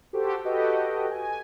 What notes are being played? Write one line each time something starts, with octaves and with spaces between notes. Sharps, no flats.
F#4 G4 A4 C5 G5
F#4 G4 A4 B4 D#5 G5
G#5